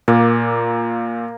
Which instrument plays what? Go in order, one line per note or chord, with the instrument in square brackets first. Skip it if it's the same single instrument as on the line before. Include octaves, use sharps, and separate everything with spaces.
[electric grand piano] A#2 [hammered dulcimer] A#3